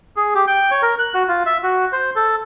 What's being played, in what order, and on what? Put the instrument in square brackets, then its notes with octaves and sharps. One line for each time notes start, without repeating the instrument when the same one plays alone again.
[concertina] G#4
G4
G5
C#5
A#4
F#6
F#4
F4
E5
F#4
C5
A4